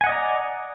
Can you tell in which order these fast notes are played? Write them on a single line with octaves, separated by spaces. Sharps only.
G#5 F#5 D#5 D5 A#5